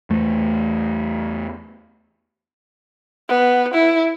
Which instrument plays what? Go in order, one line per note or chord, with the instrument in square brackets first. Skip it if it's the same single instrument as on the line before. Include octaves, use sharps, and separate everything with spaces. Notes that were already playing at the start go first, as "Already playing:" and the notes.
[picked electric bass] E2 A3
[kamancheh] B3
E4